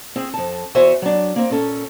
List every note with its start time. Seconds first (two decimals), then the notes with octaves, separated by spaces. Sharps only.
0.16 C4 G#4
0.34 F2 A5
0.75 E2 F#4 C5 C#5 E5 G#5
1.02 F#3 D4
1.36 A#3 C4
1.50 A#2 C#4 A4